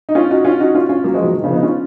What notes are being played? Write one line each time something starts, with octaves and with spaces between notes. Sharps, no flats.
D#4
C#4 F4
D#4 F#4
C#4 F4
D#4 F#4
C#4 F4
C#4 F4
F#3 A#3
F3 G#3
D#3 F#3
D#3
C#3 F3
B3 D#4
C#4 F4